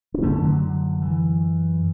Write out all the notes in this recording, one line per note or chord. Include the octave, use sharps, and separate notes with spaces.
D4
F#2 D3 A3 C#4
D3 F#3
E3